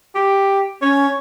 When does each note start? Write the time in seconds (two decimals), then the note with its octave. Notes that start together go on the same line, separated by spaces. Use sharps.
0.15 G4
0.82 C#4 C#5